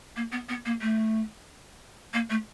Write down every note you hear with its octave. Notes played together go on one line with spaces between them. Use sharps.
A#3
B3
B3
A#3
A3
A#3
A3